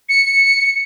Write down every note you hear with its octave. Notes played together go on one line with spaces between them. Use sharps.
C#7